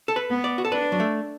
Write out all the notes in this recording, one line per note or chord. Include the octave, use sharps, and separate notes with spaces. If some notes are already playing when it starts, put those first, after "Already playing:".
A4
B4
B3
D5
F#4
A4
D4 B4
F#3
A3